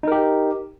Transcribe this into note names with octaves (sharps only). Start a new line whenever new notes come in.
D#4 G4 A#4